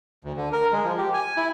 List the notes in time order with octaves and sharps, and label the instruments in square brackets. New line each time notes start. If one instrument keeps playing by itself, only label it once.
[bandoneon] D2
D3
A#4
G#3
F3
G4
G#5
E4